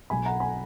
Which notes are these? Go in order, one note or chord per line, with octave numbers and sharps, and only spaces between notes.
B1 B2 F#3 G#5 B5
F#5 A#5
G#5 B5